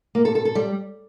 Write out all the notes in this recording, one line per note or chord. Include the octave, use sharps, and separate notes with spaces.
A#3
A4
A4
A4
G3